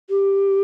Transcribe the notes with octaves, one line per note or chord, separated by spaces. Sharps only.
G4